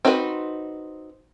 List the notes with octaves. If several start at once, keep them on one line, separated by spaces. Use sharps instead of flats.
C4 D#4 F#4 A4 B4